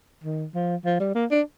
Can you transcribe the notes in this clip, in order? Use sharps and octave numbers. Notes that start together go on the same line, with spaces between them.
D#3
F3
F3
G3
A#3
D4